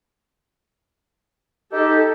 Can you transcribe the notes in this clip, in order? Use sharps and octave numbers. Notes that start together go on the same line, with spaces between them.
D#4 G4 A4